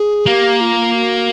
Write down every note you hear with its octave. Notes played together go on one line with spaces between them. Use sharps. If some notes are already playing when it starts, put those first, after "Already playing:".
Already playing: G#4
A#3 G4
F4
F#4